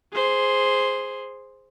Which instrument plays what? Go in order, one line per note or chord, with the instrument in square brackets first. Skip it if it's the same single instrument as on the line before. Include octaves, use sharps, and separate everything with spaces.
[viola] G#4 C5